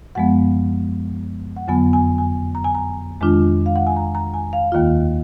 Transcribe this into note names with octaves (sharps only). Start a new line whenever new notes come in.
F#2 F3 G#3 B3 F#5
F#5
F2 D3 F#3 B3 G#5
G#5
G#5
A#5
G#5
A#5
F2 D#3 G#3 D4 F4
F5
F#5
G#5
A#5
A#5
G#5
F5
D#2 D#3 A#3 F4